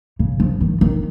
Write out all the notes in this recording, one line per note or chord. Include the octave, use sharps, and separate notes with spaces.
C#3
F3
D#3
D#3